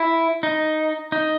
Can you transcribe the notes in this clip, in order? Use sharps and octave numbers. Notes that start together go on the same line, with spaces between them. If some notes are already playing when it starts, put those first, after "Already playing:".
Already playing: E4
D#4
D#4